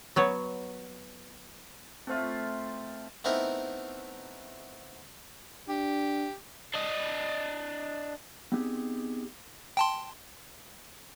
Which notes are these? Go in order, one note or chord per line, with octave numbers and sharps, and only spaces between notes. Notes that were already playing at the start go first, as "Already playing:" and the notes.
F#3 B3 C#5
A3 C4 F4 C5 E5
A3 B3 C4 D#4 E4 A#4
D4 G4
D4 D#5
B3 C4 D#4 G4 G#4
G5 A5 C6